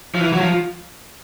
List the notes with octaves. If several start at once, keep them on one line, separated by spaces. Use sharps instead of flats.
F3
E3
F#3
F3